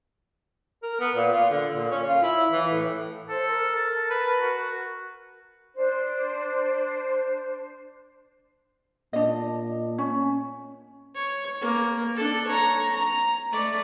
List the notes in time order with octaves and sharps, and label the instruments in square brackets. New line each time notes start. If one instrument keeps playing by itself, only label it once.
[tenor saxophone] A#4
B3
A#2
F4
D3
A#2
C#4
F4
E4
E3
A2
[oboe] A4 [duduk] C5
[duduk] A#4
[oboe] A5
B4
F#4
[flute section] D4 C5
[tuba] A#2 [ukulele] D4 D#5
[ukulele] C#4
[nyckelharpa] C#5
A#3
D4 A4
C#5 A#5
A#5
A3 D5